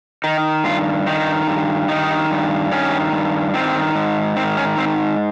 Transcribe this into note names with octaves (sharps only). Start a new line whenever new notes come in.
D#3 D#4
G2 F4
D#3 D#4
G2
D#3 D#4
G2
D#3 C#4
G2
D#3 C4
G#2
D#3 C4
C#4
G#2 C4